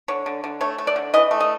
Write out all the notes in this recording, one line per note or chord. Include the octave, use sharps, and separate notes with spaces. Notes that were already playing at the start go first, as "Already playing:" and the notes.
D3 C#5
D3
D3
A3 C#5
A3
D5
D3
E3 D#5
A3
D#5